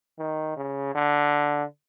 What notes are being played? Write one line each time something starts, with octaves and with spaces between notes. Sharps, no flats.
D#3
C#3
D3